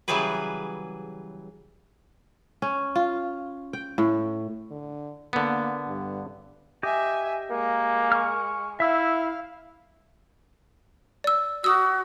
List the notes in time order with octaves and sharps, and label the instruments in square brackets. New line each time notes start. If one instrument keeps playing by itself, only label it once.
[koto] C#3 E3 F#3 G3 G#4 B4
[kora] C#4
F4
G5
A2
[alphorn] D3
[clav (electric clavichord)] D3 B3 [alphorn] A#3
[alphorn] G2
[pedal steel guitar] G4 D#5 [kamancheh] E5 G#5
[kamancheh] G#3 [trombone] A#3
[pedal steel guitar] C#6 F6
[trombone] E4 [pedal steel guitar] E5 E6 [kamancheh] F5
[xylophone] D5 E6
[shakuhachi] F#4 [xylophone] D#6 E6